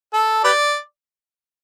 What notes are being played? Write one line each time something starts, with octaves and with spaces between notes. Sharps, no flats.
A4
G4 B4 D5